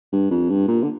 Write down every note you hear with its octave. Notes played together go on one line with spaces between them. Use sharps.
G2
F2
G2
A#2
D3